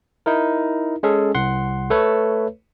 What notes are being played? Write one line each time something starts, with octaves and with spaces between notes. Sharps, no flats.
D#4 E4 A#4
G#3 C#4 G#4 A4
C2 F#5 C6
A3 A4 B4 C#5